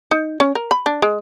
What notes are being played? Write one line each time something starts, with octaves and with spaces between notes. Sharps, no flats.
D#4
C#4
A#4
B5
D4
G#3